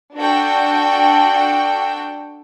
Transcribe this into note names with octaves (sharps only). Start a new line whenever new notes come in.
D4 F#4 A4 G5